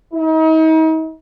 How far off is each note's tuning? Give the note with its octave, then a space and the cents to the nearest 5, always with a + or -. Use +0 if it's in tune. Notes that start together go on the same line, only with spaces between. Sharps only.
D#4 +40